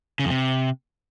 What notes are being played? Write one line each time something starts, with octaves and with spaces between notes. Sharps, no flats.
C#3
F2
C3